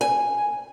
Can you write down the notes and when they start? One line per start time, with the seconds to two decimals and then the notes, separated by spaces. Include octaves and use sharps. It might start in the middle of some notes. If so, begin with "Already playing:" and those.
0.01 G#5